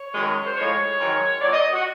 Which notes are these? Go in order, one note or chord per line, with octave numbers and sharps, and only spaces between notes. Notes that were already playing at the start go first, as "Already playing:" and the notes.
Already playing: C#5
F#2 D#3 G#3
C5
A2 F3 G#3 C#5
G#2 D#3 F#3
A#2 F#3 D5
D#5
F#4